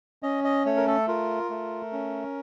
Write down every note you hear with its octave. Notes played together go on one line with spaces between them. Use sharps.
C#4 D#5
D#5
A3 C#5
A#4
A4
F4 A#4
A3
C#4